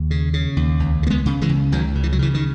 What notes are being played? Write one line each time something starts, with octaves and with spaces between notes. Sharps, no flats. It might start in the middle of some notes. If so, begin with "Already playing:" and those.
Already playing: D#2
C#3
C#3
D#2
C#2
C#3
A#3
G#3 B3
C#3
E3 G#3
C#2
C#2 D#3 F#3
C#3
E3
F#3
C#3 E3
D#3